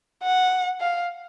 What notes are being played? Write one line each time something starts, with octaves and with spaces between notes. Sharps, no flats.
F#5
F5